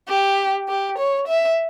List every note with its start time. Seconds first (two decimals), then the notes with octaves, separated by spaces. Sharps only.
0.09 G4
0.69 G4
0.99 C#5
1.28 E5